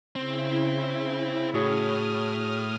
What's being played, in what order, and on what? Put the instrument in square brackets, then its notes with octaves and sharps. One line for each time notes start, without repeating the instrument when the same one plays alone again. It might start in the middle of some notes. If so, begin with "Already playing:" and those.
[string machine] C#3 E4 [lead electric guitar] C4
[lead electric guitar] A2 [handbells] F#4 G#4 C#5 [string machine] D#6 F6